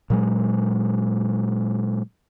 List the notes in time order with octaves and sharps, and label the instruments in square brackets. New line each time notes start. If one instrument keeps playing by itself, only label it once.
[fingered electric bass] A#2 F#3 G#3